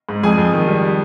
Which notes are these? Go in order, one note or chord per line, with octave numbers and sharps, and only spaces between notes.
G#2
F2 G#4 G#5
F2
D#3
G3